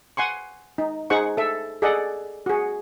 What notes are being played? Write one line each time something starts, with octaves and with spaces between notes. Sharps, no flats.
F#5 G#5 C6 C#6
D#4
D#4 G#4 C5 F#5 C#6
A4 E5
G#4 A4 D5 D#5 F#5
F#4 G#4